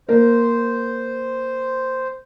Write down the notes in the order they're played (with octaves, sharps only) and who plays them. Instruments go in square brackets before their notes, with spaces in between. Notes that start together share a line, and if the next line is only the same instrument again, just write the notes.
[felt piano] A#3 A#4 [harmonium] C5